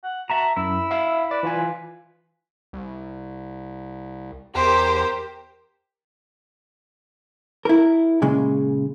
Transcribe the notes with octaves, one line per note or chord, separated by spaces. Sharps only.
F#5
F#4 E5 A5 A#5
F#2 E4 E6
E5 F5 B5
B4 D5
E3 F4 G#5
C2
E2 G4 A#4 C5
E4 A#4
A#2 C#3 G#3